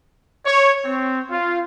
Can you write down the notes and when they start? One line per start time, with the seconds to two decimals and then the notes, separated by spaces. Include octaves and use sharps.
0.45 C#5
0.85 C4
1.31 F4